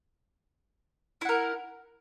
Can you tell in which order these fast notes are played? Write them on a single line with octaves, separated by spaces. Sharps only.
E4 F#5 A#4